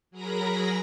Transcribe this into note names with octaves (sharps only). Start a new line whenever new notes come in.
F#3 G#4 A#4 A#5 B5 A#6